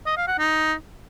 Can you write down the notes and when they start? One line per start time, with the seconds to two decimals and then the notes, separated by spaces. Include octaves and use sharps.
0.06 D#5
0.17 F5
0.28 F#5
0.38 D#4